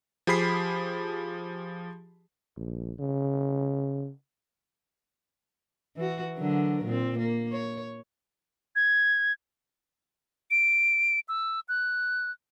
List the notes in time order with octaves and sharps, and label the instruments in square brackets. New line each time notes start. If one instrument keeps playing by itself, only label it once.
[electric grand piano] F3 G4 G#4 B5 B6 C7
[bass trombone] A#1
C#3
[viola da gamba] E3 F#4
D3 F#3 A#4
A#2 C4
A#3
C#5
[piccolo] G#6
D7
E6
F#6